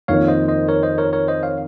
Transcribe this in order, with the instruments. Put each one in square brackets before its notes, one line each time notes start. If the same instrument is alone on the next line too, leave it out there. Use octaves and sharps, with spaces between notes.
[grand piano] F2 D#3 A#3 F4 [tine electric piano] C#5 F5
[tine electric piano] C5 D#5
C5 D#5
A#4 C#5
C5 D#5
A#4 C#5
A#4 C#5
C5 D#5
C#5 F5